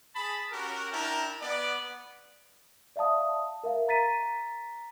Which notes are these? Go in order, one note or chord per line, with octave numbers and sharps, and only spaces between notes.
G#4 A5 B5
C#4 F#4 G4 A#4
D4 E4 A#4 G5 A5 A#5
B3 D5
D5 E5 F5 A5 D#6
A#4 E5 F5
A#5 A6 B6 D#7